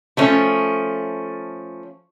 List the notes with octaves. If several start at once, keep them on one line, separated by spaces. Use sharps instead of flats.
F3 A3 C#4